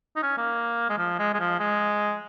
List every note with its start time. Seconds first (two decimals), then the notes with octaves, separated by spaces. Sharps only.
0.16 D#4
0.23 C#4
0.38 A#3
0.90 G#3
0.98 F3
1.19 G#3
1.34 G#3
1.39 F3
1.59 G#3